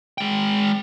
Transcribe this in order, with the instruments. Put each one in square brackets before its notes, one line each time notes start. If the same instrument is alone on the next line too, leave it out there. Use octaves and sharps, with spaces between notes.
[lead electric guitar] G#3 G5